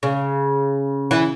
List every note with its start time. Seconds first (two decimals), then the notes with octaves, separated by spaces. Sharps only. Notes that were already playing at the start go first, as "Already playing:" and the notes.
0.03 C#3
1.11 E3